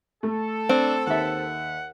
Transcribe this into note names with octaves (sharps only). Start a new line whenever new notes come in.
A3 A4
C4 D4
D#2 E5 F#5